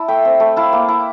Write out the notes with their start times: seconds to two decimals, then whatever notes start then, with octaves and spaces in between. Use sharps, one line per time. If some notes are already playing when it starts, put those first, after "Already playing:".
Already playing: E4 D5 A5
0.08 A3 E5 G5
0.25 C4
0.40 A3
0.56 E4 F5 A5
0.73 A#3
0.88 E4